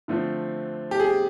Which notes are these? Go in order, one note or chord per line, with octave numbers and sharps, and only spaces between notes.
D3 F3 A3 C4
G4
G#4